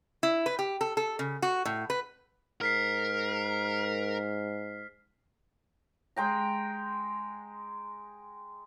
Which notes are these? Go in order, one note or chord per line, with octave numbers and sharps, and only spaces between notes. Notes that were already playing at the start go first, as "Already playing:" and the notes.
E4
B4
G4
A4
A4
C#3
F#4
A2
B4
G#2 A#4 F6 B6 C7
G#3 G5 A#5